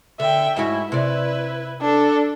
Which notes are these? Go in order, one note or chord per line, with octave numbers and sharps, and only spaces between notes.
D3 E5 G5
G#2 C#4 E4 F#4
C3 E4 B4 D5
D4 A4